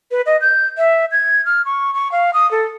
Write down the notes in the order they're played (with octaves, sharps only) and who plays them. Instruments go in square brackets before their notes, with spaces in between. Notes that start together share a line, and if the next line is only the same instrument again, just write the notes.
[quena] B4
D#5
G6
E5
G#6
F6
C#6
C#6
F5
D#6
A4